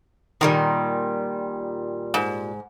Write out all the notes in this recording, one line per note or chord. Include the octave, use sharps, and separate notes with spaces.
A#2 D3 D#3 G3
G#2